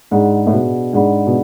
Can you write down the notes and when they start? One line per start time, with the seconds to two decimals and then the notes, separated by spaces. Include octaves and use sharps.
0.11 G#2 D4 G#4 D5 F#5 B5
0.47 A2
0.53 B2
0.93 G#2 D4 G#4 D5 F#5 B5
1.27 B2